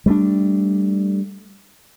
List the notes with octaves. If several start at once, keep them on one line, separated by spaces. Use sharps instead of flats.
G3 A3 A#3 D4